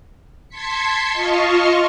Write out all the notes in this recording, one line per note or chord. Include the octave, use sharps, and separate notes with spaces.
A5 C6 G#6 B6 C#7
F4 D#5 A5 C6 C#6 F6